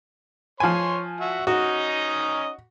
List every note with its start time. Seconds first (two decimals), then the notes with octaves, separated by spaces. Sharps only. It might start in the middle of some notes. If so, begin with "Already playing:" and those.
0.60 F3 C#5 G#5 C6
1.21 F#4 E5
1.47 C#4 D#4 F#4 D#5